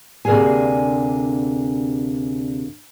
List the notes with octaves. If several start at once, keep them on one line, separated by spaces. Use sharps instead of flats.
D2 C3 A#3 D4 G#4 G#5